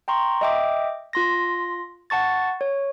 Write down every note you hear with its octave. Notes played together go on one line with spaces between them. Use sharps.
G5 A#5 C6 C#6
D#5 E5 G5 D6
F4 C6 A#6
F#5 A5 C#6 A6
C#5